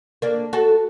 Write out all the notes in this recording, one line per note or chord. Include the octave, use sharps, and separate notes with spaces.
A#3 D4
F#4 A4